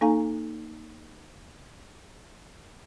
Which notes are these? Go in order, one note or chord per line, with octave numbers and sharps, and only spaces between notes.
A#3 D#4 A4 F5 G#5 A#5